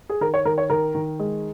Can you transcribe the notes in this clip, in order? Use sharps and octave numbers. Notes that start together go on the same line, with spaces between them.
G#4
D#3 A#4
C#5
D#3 A#4
C#5
D#3 A#4
D#3
G#3